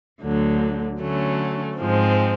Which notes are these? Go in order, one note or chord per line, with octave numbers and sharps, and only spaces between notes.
D2 D3 F#3
D3 F#3 A3 C#4
G#2 F3 G#3 C4